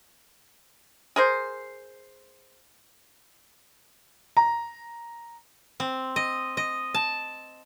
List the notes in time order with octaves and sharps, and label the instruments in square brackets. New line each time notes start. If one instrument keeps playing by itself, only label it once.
[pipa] G#4 A#4 C5
[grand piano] A#5
[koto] C4
D#5
D#5
A5